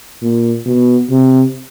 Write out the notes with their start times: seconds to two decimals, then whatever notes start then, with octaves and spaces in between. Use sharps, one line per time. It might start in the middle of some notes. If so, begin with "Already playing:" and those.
0.22 A#2
0.66 B2
1.10 C3